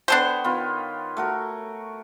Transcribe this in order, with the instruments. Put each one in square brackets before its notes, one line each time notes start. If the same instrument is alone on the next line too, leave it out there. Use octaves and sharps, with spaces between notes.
[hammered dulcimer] B3 C#5 G5 [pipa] D4 A4 C5
[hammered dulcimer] D#3 B3 F4
A3 F#4 A#4